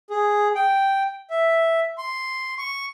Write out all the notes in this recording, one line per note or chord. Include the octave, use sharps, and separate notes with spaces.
G#4
G5
E5
C6
C#6